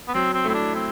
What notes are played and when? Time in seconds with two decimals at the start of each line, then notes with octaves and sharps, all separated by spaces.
0.08 B3
0.14 F#3 C4
0.34 C4
0.45 A3 C4 E4
0.54 D4
0.75 C4